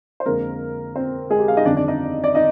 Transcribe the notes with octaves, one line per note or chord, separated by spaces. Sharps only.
C5
F2 D3 G#3 A#3 A#4
C4 C5
G#3 G#4
G4
F5
D#4 D#5
G1 F2 D#3 D4 D5
D4 D5
D#4 D#5
D5
D#4 D#5